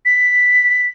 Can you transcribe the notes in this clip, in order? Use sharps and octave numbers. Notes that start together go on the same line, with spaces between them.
B6